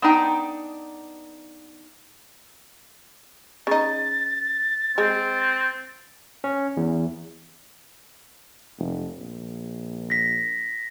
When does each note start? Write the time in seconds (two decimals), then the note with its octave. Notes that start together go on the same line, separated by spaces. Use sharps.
0.02 B3 D4 D#4 G5
3.67 C#3 D#4 A6
4.98 G#3 C4
6.44 C#4
6.77 E2
8.79 F1
9.18 A#1
10.10 A#6 B6